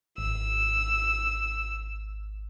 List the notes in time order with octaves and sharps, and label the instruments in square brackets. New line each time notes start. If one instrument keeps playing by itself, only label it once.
[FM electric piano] G#1 [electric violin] E6